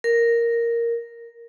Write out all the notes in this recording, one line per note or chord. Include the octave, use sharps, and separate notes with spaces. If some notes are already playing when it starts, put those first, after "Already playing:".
A#4